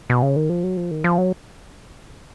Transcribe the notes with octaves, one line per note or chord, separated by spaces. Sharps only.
B2
C#3
D#3
F3
F#3
F3
D#3
F3
F#3